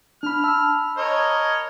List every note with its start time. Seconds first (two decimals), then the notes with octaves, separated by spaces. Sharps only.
0.23 D4 B5 F6
0.44 A5 B5 E6
0.97 A#4 C#5 D#5